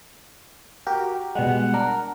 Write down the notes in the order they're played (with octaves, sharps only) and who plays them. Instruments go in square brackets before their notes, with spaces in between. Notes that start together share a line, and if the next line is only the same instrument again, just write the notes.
[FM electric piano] F#4 G4 A#4
[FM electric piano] B2 G3 G#3 [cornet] F#5
[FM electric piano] D4 A#4